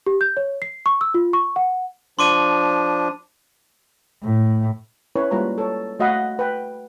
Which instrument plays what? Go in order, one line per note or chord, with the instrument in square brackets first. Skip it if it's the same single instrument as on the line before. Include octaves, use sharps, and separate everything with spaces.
[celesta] G4
G6
C#5
C7
C#6
E6
F4
C#6
F#5
[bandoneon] F3 D4 [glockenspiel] C6 D6 D#7
[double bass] A2
[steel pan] C#4 E4 B4 C#5
G3 G#3 A#3 F4 B4 A#5
A4 C#5
A3 F#4 D#5 F5 F#5 B5
B4 G5